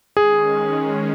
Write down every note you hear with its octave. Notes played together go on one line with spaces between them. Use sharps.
D#3 G#3 C#4 G#4